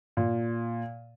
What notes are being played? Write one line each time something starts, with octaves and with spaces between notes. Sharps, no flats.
A#2